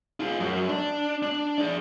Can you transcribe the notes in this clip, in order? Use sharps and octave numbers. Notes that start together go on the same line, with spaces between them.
F4 G#4
F#2
D4
D4
G#4 D5